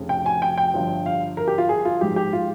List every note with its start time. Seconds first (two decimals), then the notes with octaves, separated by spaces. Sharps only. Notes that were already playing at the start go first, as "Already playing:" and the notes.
Already playing: F1 F2 C#3
0.09 G5
0.26 G#5
0.42 G5
0.58 G5
0.74 G1 G2 F3
1.06 F5
1.37 A#4
1.48 G4
1.58 F4
1.69 G#4
1.85 F4
2.01 A#1 G#2 F3 G4
2.16 G4
2.33 F4